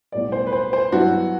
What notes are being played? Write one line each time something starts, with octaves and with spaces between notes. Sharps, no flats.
B1 A2 G3 B3 D5
C5
B4
C5
C5
G2 F#3 B3 E4 F#4